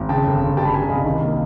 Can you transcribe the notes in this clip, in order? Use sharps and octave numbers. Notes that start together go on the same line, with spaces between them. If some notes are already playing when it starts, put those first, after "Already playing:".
Already playing: G#1
C#3 G5 A5
G1
C#3
G3 G5 A5
B5
G3 G#5 A#5
C2 D#5 F5
D#3
A#3